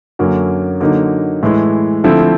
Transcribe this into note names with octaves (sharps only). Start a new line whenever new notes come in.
F#2 D3 F#3 A#3 C#4
D3 F#3 A#3 D#4
A2 E3 G#3
D3 F3 A3 C4 E4